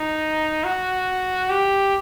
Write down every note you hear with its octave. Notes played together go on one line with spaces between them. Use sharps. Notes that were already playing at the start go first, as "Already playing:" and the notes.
Already playing: D#4
F#4
G4